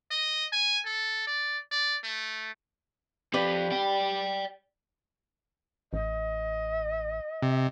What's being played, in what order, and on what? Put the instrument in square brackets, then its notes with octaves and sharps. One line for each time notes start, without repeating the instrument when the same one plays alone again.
[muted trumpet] D#5
G#5
A4
D5
D5
A3
[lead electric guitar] F3 C4 [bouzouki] D4 G4 B4
[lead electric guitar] D5 G5
[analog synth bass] A1 [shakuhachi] D#5
[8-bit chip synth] C3